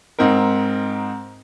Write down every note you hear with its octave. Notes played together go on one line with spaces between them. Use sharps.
G#2 C4 D#4 A#4